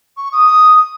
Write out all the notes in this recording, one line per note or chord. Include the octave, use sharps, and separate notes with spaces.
C#6
D#6